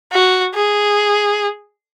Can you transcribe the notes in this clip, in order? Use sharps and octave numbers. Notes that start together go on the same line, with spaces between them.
F#4
G#4